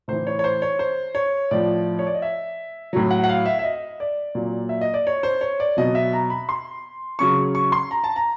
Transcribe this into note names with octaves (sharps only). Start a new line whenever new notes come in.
A2 E3 C5
C#5
C#5
C5
C#5
C5
C#5
A2 F3 D5
C#5
D5
D#5
E5
A2 F#3
F#5
F#5
F5
E5
E5
D#5
D5
A#2 F#3
E5
D#5
D5
C#5
C5
C#5
D5
B2 F#3 D#5
E5
A#5
B5
C6
C#3 F#3 C#6
C#6
C6
A#5
A5
A#5